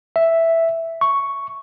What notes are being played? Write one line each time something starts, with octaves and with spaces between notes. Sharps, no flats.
E5
C#6